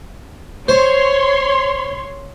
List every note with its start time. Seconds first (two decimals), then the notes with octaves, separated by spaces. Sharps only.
0.68 C5 C#5 C6